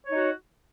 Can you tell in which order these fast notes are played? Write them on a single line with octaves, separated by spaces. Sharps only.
C#5 D#4 F#4